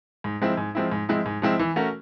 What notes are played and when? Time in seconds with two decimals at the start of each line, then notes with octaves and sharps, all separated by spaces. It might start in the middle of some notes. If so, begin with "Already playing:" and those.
0.24 G#2
0.41 F3 G#3 C4 E4
0.57 G#2
0.75 F3 G#3 C4 E4
0.91 G#2
1.09 F3 G#3 C4 E4
1.26 G#2
1.42 F3 G#3 C4 E4
1.59 E3
1.76 A3 C#4 F#4 A#4